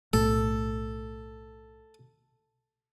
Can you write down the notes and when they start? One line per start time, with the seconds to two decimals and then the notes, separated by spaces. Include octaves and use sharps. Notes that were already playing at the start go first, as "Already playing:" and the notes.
0.13 B1 A2 A3 A4